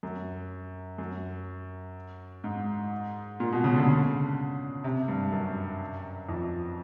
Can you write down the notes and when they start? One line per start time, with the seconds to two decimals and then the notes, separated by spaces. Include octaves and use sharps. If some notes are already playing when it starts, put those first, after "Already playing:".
0.03 F#2
0.98 F#2
2.44 G#2
3.40 A#2
3.52 B2
3.64 C#3
3.76 D3
3.87 C#3
4.84 C3
5.08 G2
5.32 F#2
6.29 F2